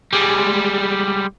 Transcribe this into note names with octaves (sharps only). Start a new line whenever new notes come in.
G3 G#3